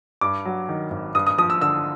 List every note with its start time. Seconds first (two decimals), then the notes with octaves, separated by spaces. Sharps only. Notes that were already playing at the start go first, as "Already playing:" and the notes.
0.21 G2 D6
0.45 F#3
0.69 D#3
0.91 G#1
1.15 G2 D#6
1.27 D#6
1.38 F3 D#6
1.50 E6
1.62 D3 E6